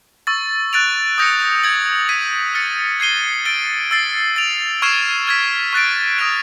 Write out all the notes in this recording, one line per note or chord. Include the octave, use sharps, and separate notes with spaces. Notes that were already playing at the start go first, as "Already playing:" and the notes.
C#6 E6 A6
F#6 A6 D7 F7
D#6 G6 A#6 C#7
G#6 C#7 F#7
G#6 B6 D#7
F6 A6 C#7
G#6 C7 D#7 G7
E6 A6 D7 G7
E6 A6 C7
A6 D7 F7
C#6 F6 G#6 C7 E7
F6 G#6 B6
C#6 F#6 A6 D7
D#6 F#6 A#6 D7 F7